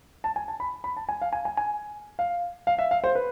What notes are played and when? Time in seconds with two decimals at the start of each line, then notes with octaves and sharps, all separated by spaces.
0.24 A5
0.36 G#5
0.48 A5
0.60 B5
0.84 B5
0.97 A5
1.09 G#5
1.22 F5
1.33 G#5
1.45 G#5
1.57 G#5
2.19 F5
2.67 F5
2.78 E5
2.91 F5
3.04 C5
3.15 B4